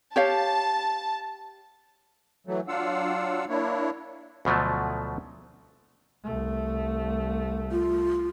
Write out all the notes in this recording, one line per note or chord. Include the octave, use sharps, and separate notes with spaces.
G4 C#5 F5 A5
E3 F#3 A3
F#3 D4 F4 F5 F#5 E6
A#3 D4 E4 C#5
D2 B2 F3 F#3 A3
C2 A3
F4